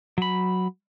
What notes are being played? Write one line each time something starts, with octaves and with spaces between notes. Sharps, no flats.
F#3 B5